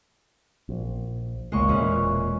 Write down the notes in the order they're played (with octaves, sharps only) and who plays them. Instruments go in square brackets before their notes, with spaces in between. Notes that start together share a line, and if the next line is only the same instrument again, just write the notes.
[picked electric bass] A#1
[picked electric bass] F1 C#2 [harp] G#3 A#3 C#6
[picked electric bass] E1 A#2 [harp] E3 C#4